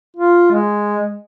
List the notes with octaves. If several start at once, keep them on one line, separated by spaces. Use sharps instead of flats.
F4
G#3